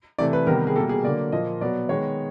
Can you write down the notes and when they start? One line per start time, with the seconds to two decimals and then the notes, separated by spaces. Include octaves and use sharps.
0.18 C3 E3 A3 D5
0.33 B4
0.47 C3 D#3 G3 B3 A#4
0.67 G#4
0.75 B2 G3 A#3 A4
0.89 G#4
1.04 D3 F#3 A#3 D5
1.32 A#2 F3 A#3 D#5
1.61 B2 F#3 B3 D5
1.89 D#3 G#3 B3 C#5